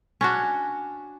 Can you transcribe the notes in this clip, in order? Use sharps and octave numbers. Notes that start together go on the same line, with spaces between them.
C#4 D4 F#4